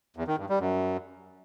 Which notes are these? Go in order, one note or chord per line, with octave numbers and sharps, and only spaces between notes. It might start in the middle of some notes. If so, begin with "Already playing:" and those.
E2
D#3
G2
G3
F#2